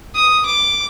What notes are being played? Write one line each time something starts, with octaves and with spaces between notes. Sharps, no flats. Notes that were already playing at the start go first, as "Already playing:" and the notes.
D#6
D6